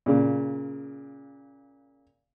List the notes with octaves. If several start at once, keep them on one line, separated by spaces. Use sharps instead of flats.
A#2 C#3